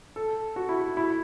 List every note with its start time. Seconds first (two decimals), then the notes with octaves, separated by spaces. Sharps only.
0.16 A4
0.56 F#4
0.69 E4
0.81 F#4
0.97 E4